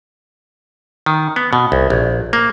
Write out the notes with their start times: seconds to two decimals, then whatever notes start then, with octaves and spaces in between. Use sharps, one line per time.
1.06 D#3
1.36 B3
1.53 B2
1.72 C2
1.90 A#1
2.33 A#3